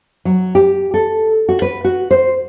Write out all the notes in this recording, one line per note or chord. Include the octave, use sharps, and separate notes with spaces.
F#3
G4
A4
F#4
B4
F#4
C5